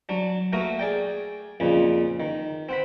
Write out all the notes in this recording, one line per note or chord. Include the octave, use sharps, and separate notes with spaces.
F#3 D4
A3 A#3 F#4 A#4 D#6
G#4 D5 G5
F2 A#2 C#3
D#3
C4 F#5 B5